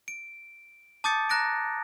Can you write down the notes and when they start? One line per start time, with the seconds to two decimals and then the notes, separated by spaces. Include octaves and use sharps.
0.08 D7
1.04 A5 D6 D#6 G6 A6 C#7
1.29 A#5 F#6 A#6 D7